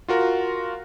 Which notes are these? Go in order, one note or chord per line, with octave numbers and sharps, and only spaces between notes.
F4 F#4 A#4